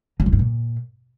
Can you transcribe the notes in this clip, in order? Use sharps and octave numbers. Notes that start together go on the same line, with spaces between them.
F#3
E2
G2
A#2